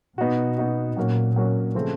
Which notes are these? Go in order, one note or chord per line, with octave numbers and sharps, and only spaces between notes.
B2 B3 D#4 F#4
B3 D#4 F#4
A#2 F#3 A#3 C#4 F#4
F#3 A#3 C#4 F#4
C#3 F3 A3 C4